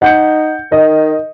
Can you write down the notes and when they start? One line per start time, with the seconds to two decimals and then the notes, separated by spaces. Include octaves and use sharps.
0.02 D#4 F#5 G6 C#7
0.72 D#3 D#5